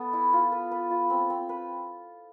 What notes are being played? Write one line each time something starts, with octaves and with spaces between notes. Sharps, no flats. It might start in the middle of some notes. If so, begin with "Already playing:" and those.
Already playing: B3 A4
E4
F4
B4
B4
F4
C4
C4
B4